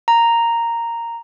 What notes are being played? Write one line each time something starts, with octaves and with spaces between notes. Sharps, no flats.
A#5